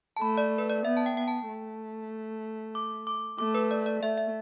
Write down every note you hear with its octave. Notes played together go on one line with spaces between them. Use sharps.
A5
A3 B5
D5
B4
D5
B3 E5
A5
G5
B3 G5
A5
A3
D6
D6
A3 D6
B4
D5
D5
A3 E5
E5